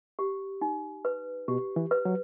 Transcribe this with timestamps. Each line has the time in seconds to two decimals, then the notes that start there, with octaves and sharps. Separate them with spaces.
0.19 G4
0.61 D#4
1.05 B4
1.48 B2 G4
1.76 E3
1.91 B4
2.05 F#3